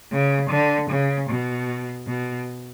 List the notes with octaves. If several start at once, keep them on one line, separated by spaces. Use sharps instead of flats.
C#3
D3
C#3
B2
B2